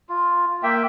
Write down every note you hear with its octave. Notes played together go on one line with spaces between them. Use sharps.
F4
A#3 E5 G5